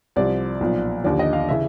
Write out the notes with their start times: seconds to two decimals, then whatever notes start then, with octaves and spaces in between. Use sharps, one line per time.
0.16 C2 C3 F3 D5
0.61 B1 A#2 F3
1.04 D#2 D3 F3 D5
1.19 D#5
1.33 F5
1.49 C#3 E3 E5